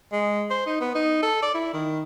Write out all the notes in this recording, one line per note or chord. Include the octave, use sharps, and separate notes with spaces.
G#3
C5
D#4
B3
D#4
A4
D5
E4
D#3